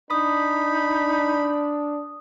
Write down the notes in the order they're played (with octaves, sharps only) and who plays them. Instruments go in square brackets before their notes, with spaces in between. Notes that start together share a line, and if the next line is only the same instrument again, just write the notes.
[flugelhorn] D4 [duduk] D#4 [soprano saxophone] B5 [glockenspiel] D#6